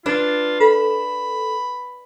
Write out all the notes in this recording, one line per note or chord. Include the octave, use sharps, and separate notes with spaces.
D4 F4 B4 A6
A4 B5